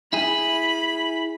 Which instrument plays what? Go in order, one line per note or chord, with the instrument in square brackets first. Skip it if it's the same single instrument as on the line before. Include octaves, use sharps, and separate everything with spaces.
[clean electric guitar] E4 G#4 [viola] B5